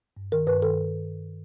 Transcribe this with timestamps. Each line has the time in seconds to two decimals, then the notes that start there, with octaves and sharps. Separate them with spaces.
0.17 G2
0.32 D#3 A#4
0.47 G2 B4
0.62 D#3 A4